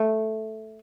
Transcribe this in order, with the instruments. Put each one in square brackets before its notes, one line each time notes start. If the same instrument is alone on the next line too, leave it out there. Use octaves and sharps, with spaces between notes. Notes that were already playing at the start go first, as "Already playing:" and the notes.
Already playing: [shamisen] A3